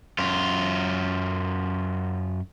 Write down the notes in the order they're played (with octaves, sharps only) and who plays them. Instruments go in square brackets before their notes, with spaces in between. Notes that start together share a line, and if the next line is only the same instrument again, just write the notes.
[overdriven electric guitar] F#2 F4